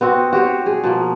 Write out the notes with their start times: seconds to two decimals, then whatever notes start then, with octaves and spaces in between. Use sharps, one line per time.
0.01 B3 C4 F#4
0.33 F#4 G4 C5 C#5
0.66 B2 G#4
0.83 B2 F3 A#3